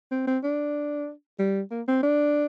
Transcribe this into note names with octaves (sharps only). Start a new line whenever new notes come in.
C4
C4
D4
G3
A#3
C4
D4